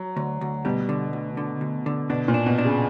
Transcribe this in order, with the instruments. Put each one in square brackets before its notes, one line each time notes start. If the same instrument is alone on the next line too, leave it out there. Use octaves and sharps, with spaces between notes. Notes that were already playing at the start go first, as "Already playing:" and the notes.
Already playing: [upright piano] F#3
[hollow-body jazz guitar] D2
D2
[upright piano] B2 [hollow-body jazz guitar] G3
[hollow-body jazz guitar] D3
D2
D3
D2
D3
[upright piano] B2 [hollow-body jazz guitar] D4
[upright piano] A#2
[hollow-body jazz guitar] D4
[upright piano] B2
[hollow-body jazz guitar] D4
[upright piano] C#3